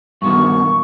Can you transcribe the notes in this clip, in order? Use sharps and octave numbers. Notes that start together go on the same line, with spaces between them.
G2 B2 D#3 C#6